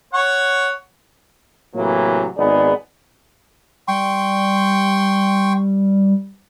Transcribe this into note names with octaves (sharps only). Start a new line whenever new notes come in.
C#5 F#5 C#6
A2 C3 E3 F#3 A#3
G#1 B3 D#4 G#4 D5
G3 G5 C6 C#6